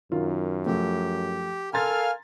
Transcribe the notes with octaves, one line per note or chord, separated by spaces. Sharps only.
F#2 D#3 F4
F3 A3 G4
A4 A#4 F5 G#5 A#5 C6 F6 A6